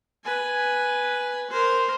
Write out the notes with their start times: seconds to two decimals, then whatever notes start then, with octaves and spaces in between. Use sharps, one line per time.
0.25 B4 G#5
1.50 A#4 C5